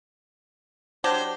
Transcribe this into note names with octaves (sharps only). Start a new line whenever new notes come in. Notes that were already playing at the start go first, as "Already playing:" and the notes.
F#3 D4 G4 C5